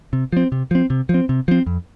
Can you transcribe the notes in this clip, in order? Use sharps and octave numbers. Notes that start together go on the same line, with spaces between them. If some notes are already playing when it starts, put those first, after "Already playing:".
C3
F3 C4
C3
F3 C4
C3
F3 C4
C3
F3 C4
F2